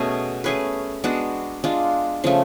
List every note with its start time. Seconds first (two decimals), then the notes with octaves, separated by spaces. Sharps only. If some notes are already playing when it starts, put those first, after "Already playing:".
Already playing: B2 A3 C#4 G#4
0.44 A3 C#4 G#4 B4
1.04 G#3 B3 D4 F#4
1.64 G#3 D4 F4
2.24 C#3 F3 A3 C#4